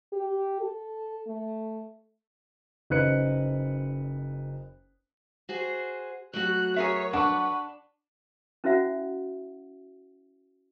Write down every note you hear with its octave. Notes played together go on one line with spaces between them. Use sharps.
G4
A4
A3
F#1 D#4 B4 C5 F#6 C#7
F#4 G#4 C5
F#3 A3 F#4 F#6
G#4 A#4 C#5 E5
D4 B4 F#5 C#6
C#4 E4 F#4 C5 E5 F#5